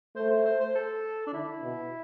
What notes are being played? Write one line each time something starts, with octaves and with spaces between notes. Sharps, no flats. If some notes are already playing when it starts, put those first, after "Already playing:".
A3 C5
C5
C5
C5
A4
D4
D3 E4
B2